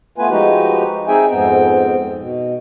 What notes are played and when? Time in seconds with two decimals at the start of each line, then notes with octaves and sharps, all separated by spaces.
0.18 A3 B3 F4 B4 G#5
0.30 F3 G#3 D#4 F#4 G4 B4
1.08 C4 D#4 G#4 E5 G5 G#5
1.30 F2 G#2 B3 C4 G5
2.20 B2